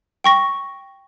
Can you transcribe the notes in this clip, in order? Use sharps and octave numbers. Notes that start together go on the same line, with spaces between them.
G5 C#6 A#6